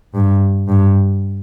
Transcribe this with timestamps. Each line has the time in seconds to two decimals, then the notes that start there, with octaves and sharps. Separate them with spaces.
0.14 G2
0.68 G2